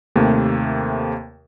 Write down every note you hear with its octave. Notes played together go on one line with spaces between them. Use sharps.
D#2 C3 A3 A#3